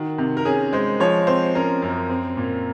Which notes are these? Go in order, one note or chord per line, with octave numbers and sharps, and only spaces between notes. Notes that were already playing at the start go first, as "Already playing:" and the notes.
Already playing: D#3 F#4
C3
A#4
C#4 G#4
G#3 C5
F3 C#5
C4 C5
C#4 A#4
F#2
C4
A#2